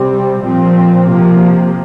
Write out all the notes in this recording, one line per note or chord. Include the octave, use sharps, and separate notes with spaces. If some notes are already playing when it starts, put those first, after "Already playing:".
Already playing: C3 G3 C4
A#2 F3 C4
C3 F3 A#3